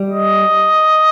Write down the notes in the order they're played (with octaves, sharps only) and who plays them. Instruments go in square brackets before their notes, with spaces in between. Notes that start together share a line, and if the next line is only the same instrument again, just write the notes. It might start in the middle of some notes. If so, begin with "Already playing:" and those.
Already playing: [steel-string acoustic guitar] G3
[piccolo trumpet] D#5